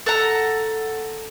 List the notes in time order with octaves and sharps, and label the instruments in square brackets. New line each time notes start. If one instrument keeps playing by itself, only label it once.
[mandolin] A4 F#5 A#5